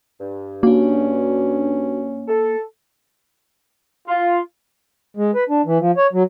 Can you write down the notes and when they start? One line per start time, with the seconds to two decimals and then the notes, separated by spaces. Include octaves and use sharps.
0.21 G2
0.63 A#3 C#4 D4 F#4
2.28 A4
4.08 F4
5.17 G#3
5.35 B4
5.49 D4
5.66 E3
5.79 F3
5.97 C#5
6.13 F#3